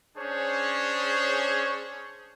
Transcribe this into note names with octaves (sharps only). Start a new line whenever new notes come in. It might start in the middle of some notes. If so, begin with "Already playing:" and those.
C#4 D4 G#4 C5 C#5